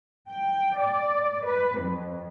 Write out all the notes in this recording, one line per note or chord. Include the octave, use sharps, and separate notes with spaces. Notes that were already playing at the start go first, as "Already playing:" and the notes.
G5
D5
B4
F2